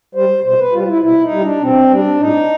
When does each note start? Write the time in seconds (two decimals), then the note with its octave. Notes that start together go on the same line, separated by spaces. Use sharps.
0.15 G3 C5
0.44 B2 C5
0.59 B4
0.73 G3 F4
0.83 F4
0.88 E4
1.02 B2 E4
1.22 D#4
1.31 G3
1.42 D4
1.61 B2 C4
1.90 G3 D4
2.19 A2 D#4